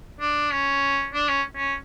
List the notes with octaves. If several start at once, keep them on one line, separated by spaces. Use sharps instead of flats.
D4
C#4
D4
C#4
C#4